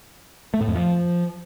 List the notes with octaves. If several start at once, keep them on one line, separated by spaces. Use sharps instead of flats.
A3
A2
F2
F3